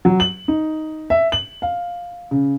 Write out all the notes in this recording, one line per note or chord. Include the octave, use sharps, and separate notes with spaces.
F#3
F#7
D#4
E5
F#7
F5
C#3